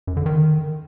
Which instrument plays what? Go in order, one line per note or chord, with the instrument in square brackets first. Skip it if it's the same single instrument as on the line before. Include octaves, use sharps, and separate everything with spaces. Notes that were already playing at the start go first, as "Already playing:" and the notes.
[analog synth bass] F#2
D3
D#3